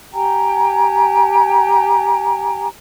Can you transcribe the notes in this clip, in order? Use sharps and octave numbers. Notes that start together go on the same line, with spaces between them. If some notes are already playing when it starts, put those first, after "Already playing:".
G4 G5 G#5 A#5